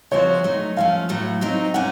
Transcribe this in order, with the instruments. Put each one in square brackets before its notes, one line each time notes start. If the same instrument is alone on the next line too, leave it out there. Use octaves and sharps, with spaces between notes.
[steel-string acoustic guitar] C#3 F3 C4 F#4 C5 [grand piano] C#5
[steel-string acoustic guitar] F#3 A3 D#4
[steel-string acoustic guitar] F3 A3 C#4 [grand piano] F5
[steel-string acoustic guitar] A2 F#3 A3
F#3 C4 D#4
[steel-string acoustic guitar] A#2 A3 C#4 [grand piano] F#5